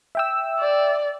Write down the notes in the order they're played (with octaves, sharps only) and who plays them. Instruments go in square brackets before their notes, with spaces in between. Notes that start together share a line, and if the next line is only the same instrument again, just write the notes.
[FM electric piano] E5 G5 E6
[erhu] D5